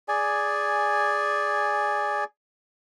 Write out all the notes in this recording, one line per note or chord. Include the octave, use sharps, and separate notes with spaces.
G#4 D5 G#5